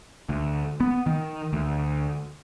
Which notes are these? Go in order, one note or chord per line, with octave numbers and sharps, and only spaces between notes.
D2
B3
D#3
D2